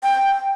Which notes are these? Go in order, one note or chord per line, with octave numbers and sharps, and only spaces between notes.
G5